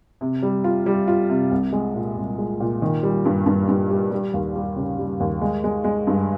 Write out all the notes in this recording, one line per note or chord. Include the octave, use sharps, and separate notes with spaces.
C3
G3
F4
G3
F4
C3
C2
G#3
A#2
C2
G#3
A#2
D#3
G3
G2
G2
G2
G3
G3
D#2
G3
C#3
G3
D#2
G#3
G#3
G#3
G2